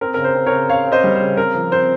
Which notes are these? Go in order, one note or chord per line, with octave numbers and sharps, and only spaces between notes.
C4 A#4
C#3 A#4
C5
C4
A#4 C#5
C#3
C#3 C#5 F5
C4
C5 D#5
G3
C5
C#3
C4 A#4
F3
C4 C5